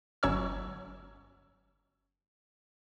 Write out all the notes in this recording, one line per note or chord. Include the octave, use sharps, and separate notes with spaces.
G1 F#3 C#4 C#5 C#6 E6